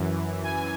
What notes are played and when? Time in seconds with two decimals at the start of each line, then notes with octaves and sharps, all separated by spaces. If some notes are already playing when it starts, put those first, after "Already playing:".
Already playing: F#2 E3
0.44 G#5